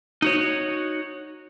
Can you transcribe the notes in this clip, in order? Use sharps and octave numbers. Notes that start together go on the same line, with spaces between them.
D#4 F#4 C#5